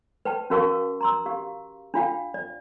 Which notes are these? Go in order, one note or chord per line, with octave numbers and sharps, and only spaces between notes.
B4 G5 A5
C#4 F#4 A#4 F5 A5 C#6
A#5 C6 E6
G4 F5
D4 F4 F5 G5
D5